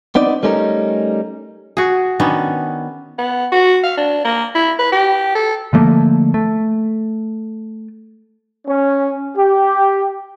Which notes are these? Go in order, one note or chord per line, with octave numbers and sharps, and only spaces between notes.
B3 C4 D#4 D5
G3 A3 C#4 D#4 A#4
F#4 G#4
D#3 B3 C#4 D4
B3
F#4
F5
D4
A#3
E4
B4
G4
A4
D3 F3 A3 A#3
A3
C#4
G4